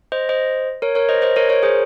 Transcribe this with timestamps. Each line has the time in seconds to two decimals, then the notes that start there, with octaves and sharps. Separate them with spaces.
0.12 C5 D#5
0.29 C5 D#5
0.82 A#4 C#5
0.95 A#4 C#5
1.09 C5 D#5
1.22 C5 D#5
1.36 A#4 C#5
1.49 A#4 C#5
1.63 G#4 C5